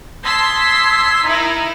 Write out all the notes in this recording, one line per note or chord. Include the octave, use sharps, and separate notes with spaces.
A5 C6 D#6 E6 G#6 B6
D#4 E4 A#4